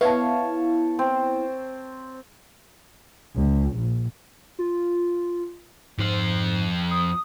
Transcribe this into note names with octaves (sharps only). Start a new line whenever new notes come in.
B3 E4 C#5 F5 A5
C4
C#2
A#1
F4
F2 G#2 C5
D#6